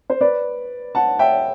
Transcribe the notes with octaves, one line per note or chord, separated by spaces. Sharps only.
C5
B4 D5
F#5 A5
E5 G5